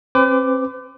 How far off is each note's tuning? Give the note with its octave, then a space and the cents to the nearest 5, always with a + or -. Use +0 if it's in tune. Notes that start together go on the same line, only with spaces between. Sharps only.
C4 +35 B4 +45 D6 +0